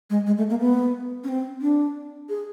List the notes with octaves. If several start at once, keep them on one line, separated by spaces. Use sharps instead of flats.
G#3
G#3
A3
A#3
B3
C#4
C4
D4
G#4